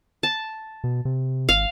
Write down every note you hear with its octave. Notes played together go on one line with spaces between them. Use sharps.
A5
B2
C3
G#1 F5